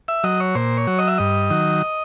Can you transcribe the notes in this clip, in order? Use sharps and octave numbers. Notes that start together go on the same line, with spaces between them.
E5
F#3 D#5
C#5
A#2 C5
C#5
F#3
D#5
E5
G2 D#5
D#3 F#3